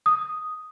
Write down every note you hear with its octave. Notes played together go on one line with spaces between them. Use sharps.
D#6